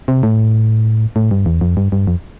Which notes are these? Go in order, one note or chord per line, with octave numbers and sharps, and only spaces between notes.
C3
A2
A2
G2
E2
F2
G2
G2
F2